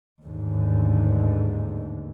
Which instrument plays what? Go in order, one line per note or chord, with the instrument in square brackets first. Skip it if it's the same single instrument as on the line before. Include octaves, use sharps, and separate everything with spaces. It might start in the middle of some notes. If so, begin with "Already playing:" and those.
[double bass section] A1 D#2 G#2 D3